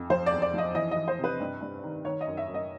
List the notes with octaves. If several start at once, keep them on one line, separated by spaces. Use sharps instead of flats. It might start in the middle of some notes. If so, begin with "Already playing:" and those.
Already playing: F2
F3 C5
E2 D5
D5
F3 D#5
E3 D#5
D#5
E3
C5
C3
B4
G2
G2
D#3
D#3 C#5
D#5
F#2
E5
F#2
D#5